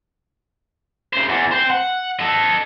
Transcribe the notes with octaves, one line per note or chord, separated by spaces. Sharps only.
C#3 C5
E2
C5 G5
F#5
A4 D#5